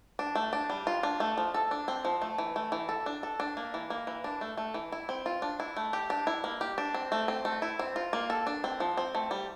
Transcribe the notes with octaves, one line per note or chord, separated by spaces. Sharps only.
D4
A3
D4
G3
F4
D4
A3
F3
A4
D4
C4
F3
A3
E3
A3
E3
A4
D4
A4
D4
A#3
E3
A#3
E3
D4
A3
A3
E3
E4
C4
F4
D4
E4
A3
G4
D4
E4
A#3
G4
D4
C4
A3
C4
A3
E4
C4
F4
A#3
A4
D4
C4
F3
C4
A3
G3